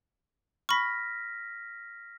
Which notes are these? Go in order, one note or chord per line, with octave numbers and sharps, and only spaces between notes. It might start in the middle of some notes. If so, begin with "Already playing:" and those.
B5 C#6 F6 A#6 B6